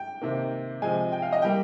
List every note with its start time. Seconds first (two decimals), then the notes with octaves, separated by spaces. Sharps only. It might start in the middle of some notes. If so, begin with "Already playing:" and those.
Already playing: G5
0.22 C3 D#3 A#3
0.82 C3 F3 G#3 G#5
1.12 G5
1.22 F5
1.32 D#5
1.42 G3 A#3 G5